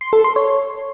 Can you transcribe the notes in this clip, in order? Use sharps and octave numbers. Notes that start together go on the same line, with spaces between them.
C6
A4
C6
C#5